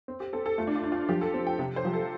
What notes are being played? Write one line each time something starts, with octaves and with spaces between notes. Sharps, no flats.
C4
G4
C4 A4
A4
A3 F4
D4
F4
D4
F4
F3 G4
A4
C4
G5
C3
C5
F3 G4
A4